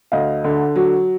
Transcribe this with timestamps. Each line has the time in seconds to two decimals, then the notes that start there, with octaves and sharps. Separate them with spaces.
0.12 D2 D#5 F5
0.44 D3
0.76 F#3